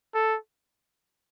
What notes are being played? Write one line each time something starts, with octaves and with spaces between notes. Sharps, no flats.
A4